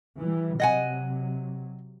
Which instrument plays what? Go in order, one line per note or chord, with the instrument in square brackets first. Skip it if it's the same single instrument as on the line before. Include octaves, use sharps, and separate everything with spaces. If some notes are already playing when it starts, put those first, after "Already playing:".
[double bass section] E3 G3
[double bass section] C3 F#3 [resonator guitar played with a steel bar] D#5 F#5 G#5